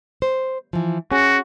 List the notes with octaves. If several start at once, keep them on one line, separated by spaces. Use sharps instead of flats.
C5
E3 F3
C#4 F#4 G#4